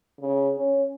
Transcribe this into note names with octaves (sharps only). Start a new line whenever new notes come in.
C#3
C#4